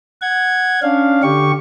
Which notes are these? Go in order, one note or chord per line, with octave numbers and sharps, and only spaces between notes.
F#5 G#6
C#4 D4 F5
D3 G4 C#6